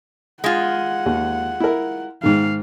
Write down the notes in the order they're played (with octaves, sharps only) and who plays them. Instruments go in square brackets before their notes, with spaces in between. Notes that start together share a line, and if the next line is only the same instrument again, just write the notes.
[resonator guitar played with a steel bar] G#3 F4 [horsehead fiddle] F#5
[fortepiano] D#2
E4 A#4
[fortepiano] G#2 D#3 [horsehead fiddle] F5